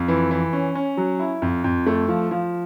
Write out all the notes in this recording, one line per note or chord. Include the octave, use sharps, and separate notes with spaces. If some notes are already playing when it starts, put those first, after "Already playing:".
Already playing: F2
E3
E3
C#4
C#4
F#3
E4
F2
F2
A3
F3
F3